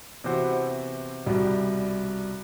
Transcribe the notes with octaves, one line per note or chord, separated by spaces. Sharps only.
C3 E3 B3 F#4 C5
C2 B2 G3